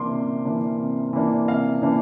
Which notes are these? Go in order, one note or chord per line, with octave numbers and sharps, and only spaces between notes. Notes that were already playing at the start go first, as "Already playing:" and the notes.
Already playing: C3 E3 A#3 D4 C6 D6
C3
E3 A#3 D4
C3
E3 A#3 D4
C3 F5
E3 A#3 D4